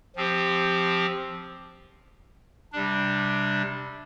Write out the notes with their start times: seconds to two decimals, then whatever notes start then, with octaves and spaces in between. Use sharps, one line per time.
0.16 F3 C4 G4
2.73 C3 G3 D4